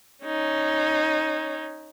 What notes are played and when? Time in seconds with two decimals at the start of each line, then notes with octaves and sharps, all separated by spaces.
0.24 C#4 D#4